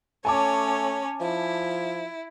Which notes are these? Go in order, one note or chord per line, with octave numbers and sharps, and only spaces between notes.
A3 C#4 C#5 G#5 A5 D6
F3 E4